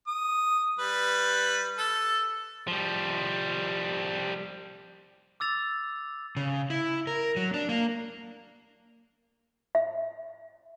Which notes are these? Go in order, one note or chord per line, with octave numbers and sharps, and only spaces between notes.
D#6
G3 B4
A4
F3 G3
D6 E6 A6 F7
C#3
E4
A#4
F#3
D4
A#3
E5